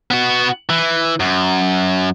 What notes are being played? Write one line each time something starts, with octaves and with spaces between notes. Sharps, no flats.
B3 F#4
E3
F#2